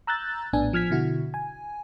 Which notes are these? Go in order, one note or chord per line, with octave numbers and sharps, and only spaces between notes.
A#5 E6 F#6 G6 A6
A#1 A2 B3 D4 G#5
F3 F6 G#6 B6
B2 D3 E4 F#4
G#5